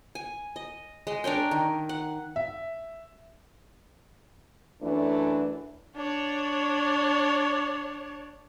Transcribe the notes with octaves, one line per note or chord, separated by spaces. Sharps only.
G#5
D#5
G#3 D#5
D4 A#4 C#5 G5
D#3
F#5
E5
F#2 E3 A3 D4
D4 C#5